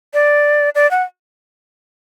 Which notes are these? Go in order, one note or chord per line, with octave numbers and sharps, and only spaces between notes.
D5
D5
F#5